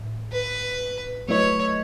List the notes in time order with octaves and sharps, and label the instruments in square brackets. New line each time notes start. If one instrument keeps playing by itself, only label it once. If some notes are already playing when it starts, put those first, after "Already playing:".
Already playing: [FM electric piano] A2
[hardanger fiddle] B4
[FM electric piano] F#3 A3 E4 B4 D#5 [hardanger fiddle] C#5